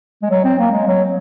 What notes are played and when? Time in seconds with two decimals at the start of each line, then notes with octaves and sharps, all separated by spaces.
0.22 G#3
0.30 F#3
0.44 C4
0.59 A#3
0.72 G#3
0.87 F#3